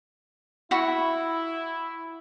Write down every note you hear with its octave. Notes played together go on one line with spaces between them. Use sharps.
E4 F#4 B5 C#6